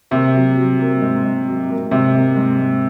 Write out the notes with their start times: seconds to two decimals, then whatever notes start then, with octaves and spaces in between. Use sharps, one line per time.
0.11 C3 A#3
0.33 F#3
0.56 F#3
0.79 A#3
1.01 G#2
1.24 G#2
1.47 F#3
1.69 A#3
1.91 G#2 C3
2.14 A#3
2.36 G#2
2.58 G#2